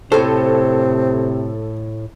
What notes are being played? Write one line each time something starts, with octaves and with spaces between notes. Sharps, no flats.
A2 C3 C4 A4 C5